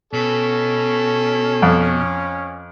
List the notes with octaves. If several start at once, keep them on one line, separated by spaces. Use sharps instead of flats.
B2 C#4 A4
F2